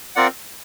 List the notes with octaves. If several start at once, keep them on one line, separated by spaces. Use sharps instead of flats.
C4 F4 A#4 D5 F#5